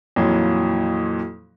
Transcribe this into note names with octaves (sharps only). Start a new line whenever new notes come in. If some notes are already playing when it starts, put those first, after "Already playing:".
F2 A#2 E3 F#3